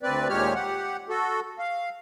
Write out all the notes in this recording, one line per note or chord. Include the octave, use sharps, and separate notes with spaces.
D2 C4 B4 D5
D#2 A#2 G#3 G4 C#5 F6
G4 F#5
F#4 A4
F5